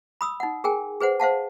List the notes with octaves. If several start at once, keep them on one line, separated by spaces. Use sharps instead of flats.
B5 D#6 E6
D#4 F#5
G#4 A#4 G5 G#5
G#4 B4 C5 F#5
C5 F5 F#5 A5